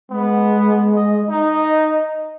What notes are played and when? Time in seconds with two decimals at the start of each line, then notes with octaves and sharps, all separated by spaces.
0.10 G#3 B3
0.95 D#5
1.29 D#4 D#5